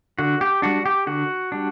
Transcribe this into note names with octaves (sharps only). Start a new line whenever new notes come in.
D3 F#4
G4
G3 D4 F#4
G4
D3 F#4
G3 D4